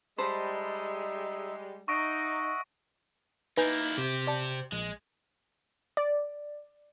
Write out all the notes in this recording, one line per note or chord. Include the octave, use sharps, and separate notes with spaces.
G3 G#3 D#4 C5 E5 A5 B5
D#4 D#5 E5 F#5 C#6 A#6 D7
A#3 D#4 E4 B4 G#5 G6
C3 G4 C5
D5 A5 C#7
A#1 G#3
D5